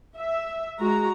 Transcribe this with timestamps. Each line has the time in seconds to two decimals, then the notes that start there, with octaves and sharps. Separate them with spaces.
0.16 E5
0.80 G#3 F#4 A#5